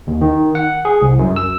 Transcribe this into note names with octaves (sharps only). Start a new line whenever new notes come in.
D#2
D#3
F#5
G#4
C2
F#2
E6